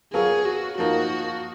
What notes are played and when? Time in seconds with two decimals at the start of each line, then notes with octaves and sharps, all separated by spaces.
0.13 F#3 B3 F4 G#4 A#4 C#5
0.45 F#4
0.78 F3 A#3 D#4 F#4 A#4